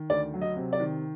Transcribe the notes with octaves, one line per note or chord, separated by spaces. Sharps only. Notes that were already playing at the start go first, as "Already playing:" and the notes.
Already playing: D#3
D2 D5
F#3
D#5
C3
D5
D#3